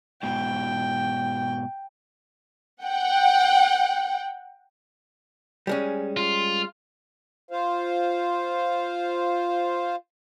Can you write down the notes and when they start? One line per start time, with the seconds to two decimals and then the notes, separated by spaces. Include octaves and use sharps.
0.23 G#2 B2 G5
2.83 F#5 G5
5.67 G3 G#3 C#4
6.17 F4
7.51 F4 C5 F5